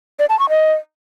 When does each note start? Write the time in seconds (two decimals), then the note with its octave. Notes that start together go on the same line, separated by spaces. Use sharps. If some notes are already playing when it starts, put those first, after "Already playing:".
0.19 D5
0.29 A5
0.39 C#6
0.49 D#5